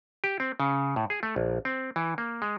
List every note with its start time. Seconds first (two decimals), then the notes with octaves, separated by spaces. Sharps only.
0.24 G4
0.40 C4
0.60 C#3
0.96 A2
1.10 G#4
1.23 A3
1.36 A#1
1.65 C4
1.96 E3
2.18 A#3
2.42 G#3